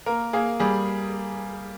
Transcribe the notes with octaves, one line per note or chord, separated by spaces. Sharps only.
A#3 A#4
A#3 G#4
G3 G#4